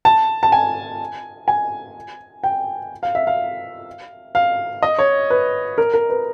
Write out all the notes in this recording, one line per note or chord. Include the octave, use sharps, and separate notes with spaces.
A5
A5
G#5
G#5
G5
F5
E5
F5
F5
D#5
C#5
B4
A#4
A#4
B4